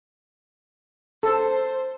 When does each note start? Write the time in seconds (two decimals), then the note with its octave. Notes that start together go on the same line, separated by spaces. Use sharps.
1.23 A4 C5